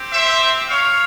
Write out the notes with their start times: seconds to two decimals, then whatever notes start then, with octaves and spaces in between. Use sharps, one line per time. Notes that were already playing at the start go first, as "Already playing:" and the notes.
Already playing: C4 G4
0.13 C5 E5
0.68 C#5 F5